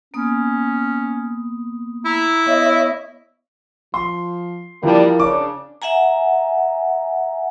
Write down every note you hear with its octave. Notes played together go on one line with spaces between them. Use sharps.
A#3 B3 C#4 D#6
E4 A#5
B3 C#5 D#5 E5
F3 C6
E3 F3 G3 A#3 D4 A#4
C#3 D4 D6
E5 F#5 G#5 A#5